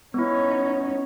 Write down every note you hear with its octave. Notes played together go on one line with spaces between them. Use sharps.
B3 C#4 D#4 E4